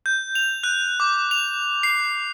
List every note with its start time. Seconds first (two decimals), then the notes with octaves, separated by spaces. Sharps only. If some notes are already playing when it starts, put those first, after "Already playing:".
0.06 G6
0.35 F7
0.64 F#6
1.00 D6
1.31 F7
1.83 C7